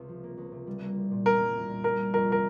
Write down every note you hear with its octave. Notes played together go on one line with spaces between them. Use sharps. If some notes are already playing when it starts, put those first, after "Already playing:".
Already playing: C#2 C3
F3
A#3
C#2
C3
G3
A#3
C2
A#2
G3 A#4
A#3
C2
A#2
G3 A#4
A#3
F2 A#4
C3 A#4